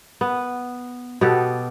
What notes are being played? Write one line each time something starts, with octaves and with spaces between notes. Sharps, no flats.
B3
B2 B3 G4 A4